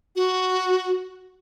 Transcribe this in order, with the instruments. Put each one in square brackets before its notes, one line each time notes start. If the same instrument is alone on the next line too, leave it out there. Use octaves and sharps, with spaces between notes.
[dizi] F#4